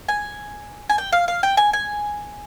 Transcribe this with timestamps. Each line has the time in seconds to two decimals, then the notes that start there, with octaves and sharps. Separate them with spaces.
0.09 G#5
0.89 G#5
0.98 G5
1.12 F5
1.28 F5
1.43 G5
1.57 G#5
1.73 G#5